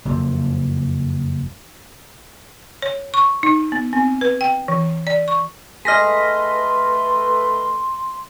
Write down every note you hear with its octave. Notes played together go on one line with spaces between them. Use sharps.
F#1 F2
C#5
C#6
D#4
B3
C4
B4
G5
E3
D5
C#6
A3 G#4 B4 D#5 C6 F6 A#6 B6